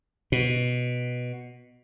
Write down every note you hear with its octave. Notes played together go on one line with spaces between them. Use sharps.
B2